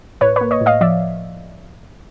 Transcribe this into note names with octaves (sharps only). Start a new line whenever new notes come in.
A2 B4 C#5
A#3 B4 C#5
C#5 D#5
A2
D#5 F5
F3 D5 E5